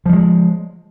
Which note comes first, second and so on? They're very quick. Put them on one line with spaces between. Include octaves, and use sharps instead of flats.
F3 G3 G#3